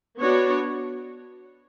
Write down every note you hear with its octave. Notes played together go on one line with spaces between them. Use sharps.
B3 D4 F#4 C#5